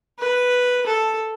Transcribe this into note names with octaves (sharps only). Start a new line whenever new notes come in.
B4
A4